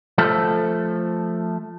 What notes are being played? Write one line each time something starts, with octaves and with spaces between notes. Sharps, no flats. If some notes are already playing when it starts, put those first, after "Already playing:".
F3 A3 A4